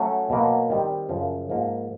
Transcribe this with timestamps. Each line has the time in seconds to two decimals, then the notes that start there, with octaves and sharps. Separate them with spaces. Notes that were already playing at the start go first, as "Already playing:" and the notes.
Already playing: F#3 A3 C#4
0.30 B2 F#3 A#3
0.70 D#3 G3 C4
1.09 F#2 C#3 F3
1.49 G#2 F3 A#3